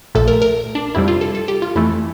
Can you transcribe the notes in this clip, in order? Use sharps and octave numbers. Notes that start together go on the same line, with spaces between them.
A#1 A#2 A3 A4
A#4
A#4
D4
F2 C3 G3 E4
F4
A4
A4
G4
F4
F2 E3 A3 E4